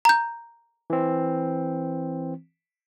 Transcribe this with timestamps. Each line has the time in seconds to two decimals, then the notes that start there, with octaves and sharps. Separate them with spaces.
0.05 A#5 G6
0.90 E3 C4